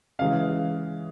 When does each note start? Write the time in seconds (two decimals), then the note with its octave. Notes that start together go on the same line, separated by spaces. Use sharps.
0.19 C#3 E3 G#3 F5